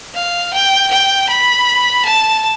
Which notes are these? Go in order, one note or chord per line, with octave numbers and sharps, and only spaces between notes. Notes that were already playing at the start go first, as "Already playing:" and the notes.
F5
G5
G5
B5
A5